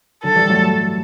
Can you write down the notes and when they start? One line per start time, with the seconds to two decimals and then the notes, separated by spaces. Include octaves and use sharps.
0.23 D3 F#3 A4
0.36 E3 G3
0.50 F#3 A3